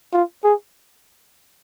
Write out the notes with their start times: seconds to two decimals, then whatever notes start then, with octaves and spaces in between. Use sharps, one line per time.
0.13 F4
0.44 G#4